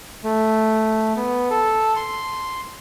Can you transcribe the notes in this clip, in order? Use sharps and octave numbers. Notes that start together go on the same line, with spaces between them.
A3
B3
A4
C6